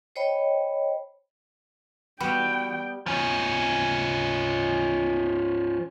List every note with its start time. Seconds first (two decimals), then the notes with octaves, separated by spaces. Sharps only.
0.16 C5 C#5 D#5 G5 B5
2.20 G3 B3 F#4 B4 G5
3.06 F3 C#4